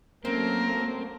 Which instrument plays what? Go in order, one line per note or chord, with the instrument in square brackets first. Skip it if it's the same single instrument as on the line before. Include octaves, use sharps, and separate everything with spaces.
[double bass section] F#3 A3 A#3 [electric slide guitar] C4 [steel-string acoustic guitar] C#4 [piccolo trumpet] A#4